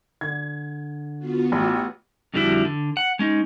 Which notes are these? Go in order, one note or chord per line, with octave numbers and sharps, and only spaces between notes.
D3 G#6
B3 F4 F#4
A1 G4
F2 D3 G3 G#3 E4 F#4
D3
F#5
G#3 C#4 D#4